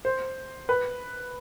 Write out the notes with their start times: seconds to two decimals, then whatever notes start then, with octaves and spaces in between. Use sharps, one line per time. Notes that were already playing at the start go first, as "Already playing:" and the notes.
0.05 C5
0.69 B4